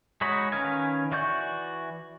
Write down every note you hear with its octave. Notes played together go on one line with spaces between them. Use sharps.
G#3 D#4 F#4 C#5 B5
D#3 C#4 B4 F5 G#5
E3 F#4 D5 C#6 G6